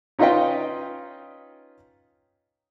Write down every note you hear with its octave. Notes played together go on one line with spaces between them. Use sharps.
C#4 D#4 F4 B4 D#5 G5